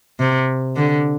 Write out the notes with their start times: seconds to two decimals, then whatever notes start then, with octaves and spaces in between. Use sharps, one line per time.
0.20 C3
0.76 D3